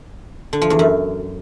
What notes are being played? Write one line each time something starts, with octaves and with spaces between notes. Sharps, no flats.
D3
F3
E2
F#2